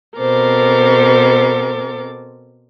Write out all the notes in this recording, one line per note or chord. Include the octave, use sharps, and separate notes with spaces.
B2 C4 A4 A#4 C5 D6